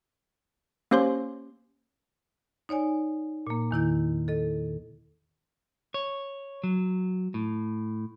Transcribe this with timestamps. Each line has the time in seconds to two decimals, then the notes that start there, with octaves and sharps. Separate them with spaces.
0.91 A#3 C#4 G4 C5 C#5 C6
2.69 D#4 C#5 D5 G#5
3.47 A#2 A#3
3.71 E2 D#3 E4 G6
4.28 A4 D#5
5.94 C#5
6.64 F#3
7.34 A2